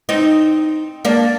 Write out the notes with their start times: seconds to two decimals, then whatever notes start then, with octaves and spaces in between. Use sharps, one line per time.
0.09 C4 D#4
1.05 A#3 D4